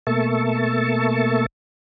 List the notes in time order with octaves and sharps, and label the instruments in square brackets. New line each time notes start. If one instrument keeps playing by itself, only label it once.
[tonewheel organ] B2 A3 A#3 E5 A5 C#6